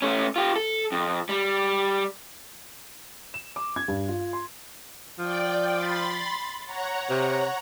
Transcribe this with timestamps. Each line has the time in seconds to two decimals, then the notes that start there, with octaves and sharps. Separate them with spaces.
0.02 A3 C#4
0.36 F4 G4
0.56 A4
0.92 F2
1.29 G3
3.34 E7
3.56 D6
3.76 G#6
3.88 G2
4.08 F4
4.33 C6
5.19 F3 D5 G5
5.76 B5 C6 A6
6.65 C#5 F#5 A#5
7.09 C3